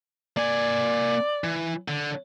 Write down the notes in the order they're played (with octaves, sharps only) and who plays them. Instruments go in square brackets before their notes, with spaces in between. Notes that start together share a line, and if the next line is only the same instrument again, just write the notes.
[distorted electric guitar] A#3 G#5 [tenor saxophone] D5
[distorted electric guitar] E3
D3